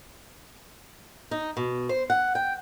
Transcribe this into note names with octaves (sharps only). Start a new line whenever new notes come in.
D#4
B2
C5
F#5
G5